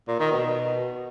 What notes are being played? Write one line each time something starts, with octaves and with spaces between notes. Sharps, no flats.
A#2
D#3
B2